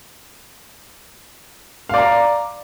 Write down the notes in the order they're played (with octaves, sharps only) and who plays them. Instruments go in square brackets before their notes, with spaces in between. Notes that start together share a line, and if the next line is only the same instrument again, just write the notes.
[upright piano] F5
D5
A#5